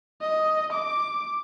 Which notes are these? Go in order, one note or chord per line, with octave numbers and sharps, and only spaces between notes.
D#5
D6